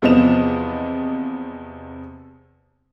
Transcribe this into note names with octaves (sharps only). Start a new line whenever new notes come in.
E2 C3 F3 B3 D#5 E7